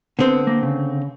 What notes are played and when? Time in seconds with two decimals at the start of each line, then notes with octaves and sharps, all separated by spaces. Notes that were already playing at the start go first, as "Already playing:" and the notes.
0.19 D3 B3 C4
0.47 A#3
0.63 C#3